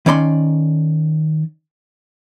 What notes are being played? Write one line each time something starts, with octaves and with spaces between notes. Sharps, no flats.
D#3 C#4 D5 B5 C6